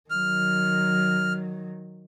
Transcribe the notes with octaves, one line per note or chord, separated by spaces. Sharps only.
D#3 F#3 F6